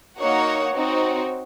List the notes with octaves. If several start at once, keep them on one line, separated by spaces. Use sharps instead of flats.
A#3 D#4 F#4 C#5 F#5
C4 D#4 F#4 C#5